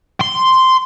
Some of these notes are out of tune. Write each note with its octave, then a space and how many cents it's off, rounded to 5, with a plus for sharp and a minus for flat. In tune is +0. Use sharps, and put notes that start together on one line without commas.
C6 -5